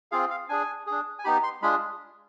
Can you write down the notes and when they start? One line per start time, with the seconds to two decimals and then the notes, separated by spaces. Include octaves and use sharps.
0.12 C4 F4 G#4 F5
0.30 F5
0.49 D4 G#4 G#5
0.86 D4 G#4
1.19 G#5
1.24 B3 D#4 G4 B5
1.43 C6
1.62 G#3 D4 F4 G#4 B5